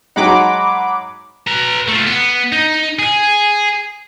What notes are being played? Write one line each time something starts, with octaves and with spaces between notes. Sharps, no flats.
F#3 G#3 D#4 F#5 B5 D6
B4 A#5
A3 F4
B3
D#4
G#4